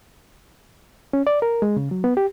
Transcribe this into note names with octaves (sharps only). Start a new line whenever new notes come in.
C#4
D5
A#4
G#3
C#3
F#3
B3
G4